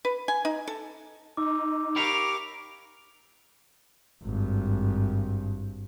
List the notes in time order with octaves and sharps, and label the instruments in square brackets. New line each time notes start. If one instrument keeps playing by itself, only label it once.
[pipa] B4
G#5
D#4
A4
[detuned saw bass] D#4 [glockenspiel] D6 E6
[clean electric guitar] G4 C#5 F5 [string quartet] A#4 D6 [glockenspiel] B5 B6 C#7
[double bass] G#1 G2